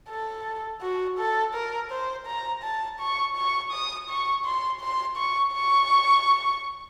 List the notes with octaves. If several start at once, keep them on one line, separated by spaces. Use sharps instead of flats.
A4
F#4
A4
A#4
C5
A#5
A5
C#6
C#6
D#6
C#6
C6
C6
C#6
C#6